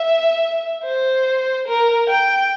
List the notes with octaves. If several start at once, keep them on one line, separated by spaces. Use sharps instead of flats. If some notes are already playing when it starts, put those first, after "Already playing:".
Already playing: E5
C5
A#4
G5